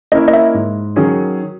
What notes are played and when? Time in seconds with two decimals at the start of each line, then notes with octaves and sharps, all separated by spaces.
0.12 A#3 C#4 E4 A#4 D#5
0.28 D#5
0.34 E5
0.54 G#2
0.96 D#3 F#3 C#4 G#4